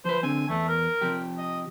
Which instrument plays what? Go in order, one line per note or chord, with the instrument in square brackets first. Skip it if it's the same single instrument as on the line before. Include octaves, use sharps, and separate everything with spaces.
[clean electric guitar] F3 B4 [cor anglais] C5
[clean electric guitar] D3 C4 [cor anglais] G#5
[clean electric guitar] E2 [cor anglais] A3
[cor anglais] A#4
[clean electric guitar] C3 F3 G4
[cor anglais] D#5